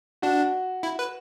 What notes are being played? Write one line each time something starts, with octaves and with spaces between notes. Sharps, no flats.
D4 F#4
E4
B4